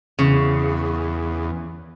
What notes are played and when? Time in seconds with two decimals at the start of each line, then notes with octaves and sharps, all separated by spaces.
0.19 E2 C#3